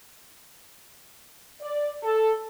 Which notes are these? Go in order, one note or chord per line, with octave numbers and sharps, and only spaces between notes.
D5
A4